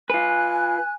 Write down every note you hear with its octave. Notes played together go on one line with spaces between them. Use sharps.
F4 B4 G#5 F#6